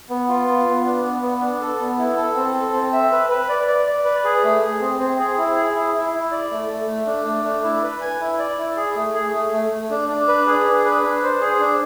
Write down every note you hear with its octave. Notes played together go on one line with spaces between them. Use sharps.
B3
F4
B3
B3
D4
B3
B3
D4
A4
B3
E4
A4
C4
A4
C4
E5
B4
B4
D5
D5
D5
B4
G#4
A3
G#4
C4
C4
G#4
E4
G#4
E4
E4
E4
D5
A3
A3
A3
D4
A3
D4
E4
B4
G#5
E4
D5
E4
G#4
A3
G#4
A3
A3
A3
D4
D4
B4
G#4
D4
B4
D4
C5
G#4
D4